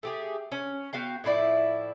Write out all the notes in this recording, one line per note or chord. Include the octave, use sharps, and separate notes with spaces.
A3 G4 G#4
C#4
B3 F#4 F5 G5
A2 F3 E4 D5